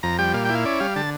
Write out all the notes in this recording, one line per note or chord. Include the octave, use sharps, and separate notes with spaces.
F2 A#5
G3 G5
A#2 F5
G5
E4
F5
C#4 D5
G3 F5
D3 A5